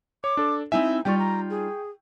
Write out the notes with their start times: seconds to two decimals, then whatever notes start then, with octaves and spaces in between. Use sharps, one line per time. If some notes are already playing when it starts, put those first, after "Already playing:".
0.24 C#5 D6
0.37 D4 A4
0.72 C4 D#4 E4 E5 G#5
1.05 G3 D#4 F4 D5 G5 C#6
1.19 A#5
1.50 G#4